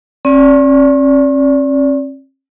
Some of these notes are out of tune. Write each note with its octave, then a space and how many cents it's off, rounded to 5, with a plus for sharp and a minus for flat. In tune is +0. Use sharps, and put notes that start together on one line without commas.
C#4 -45 D5 -25